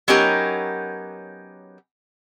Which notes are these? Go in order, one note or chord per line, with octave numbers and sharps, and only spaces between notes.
F#3 B3 C#4 D#4 G4 A#4